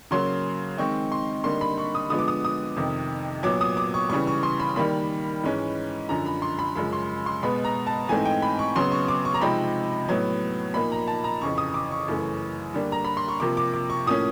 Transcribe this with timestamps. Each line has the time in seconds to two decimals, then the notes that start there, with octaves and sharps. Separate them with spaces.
0.11 C#3 F#3 A#3 C6
0.78 D#3 G#3 C4 D#4 C#6
1.12 C6
1.44 D3 G3 A#3 D#4 C6
1.61 B5
1.78 C#6
1.95 D#6
2.10 D3 F3 G#3 B3 D#6
2.19 D6
2.28 D#6
2.45 D#6
2.77 F2 C3 D#3
3.43 A#2 F#3 B3 D6
3.61 D#6
3.77 D6
3.94 C#6
4.09 C#3 E3 G3 C#6
4.27 C#6
4.43 C6
4.60 B5
4.76 D#3 G3 A#3 B5
5.44 G#2 E3 G#3 C#4
6.09 F#2 D3 F3 A#5
6.26 B5
6.42 C6
6.59 B5
6.76 F#2 C#3 F3 G#3 B5
6.93 C6
7.26 C6
7.43 B2 G#3 B3 B5
7.64 A#5
7.87 A5
8.08 G#2 E3 A3 C4 D#4 G#5
8.25 G5
8.42 B5
8.59 C#6
8.76 C#3 F#3 B3 C6
8.92 C#6
9.08 D6
9.25 C#6
9.34 A#5
9.41 C3 F3 G#3 C4 D#4 B5
10.08 A2 F#3 B3
10.74 A#2 F3 A#3 D#4 B5
10.92 A#5
11.07 A5
11.24 A#5
11.41 F2 C#3 E3 C#6
11.58 D#6
11.74 D6
11.91 C#6
12.08 F#2 C#3 E3 A3
12.74 D3 G3 A#3 D4
12.92 A#5
13.04 B5
13.17 C6
13.28 C#6
13.40 C3 F3 A#3 D6
13.57 D6
13.74 D6
13.90 C#6
14.06 A2 F3 A#3 C#4 D#6